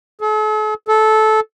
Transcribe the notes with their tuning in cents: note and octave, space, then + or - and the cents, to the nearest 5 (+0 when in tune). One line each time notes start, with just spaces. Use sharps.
A4 -45
A4 -15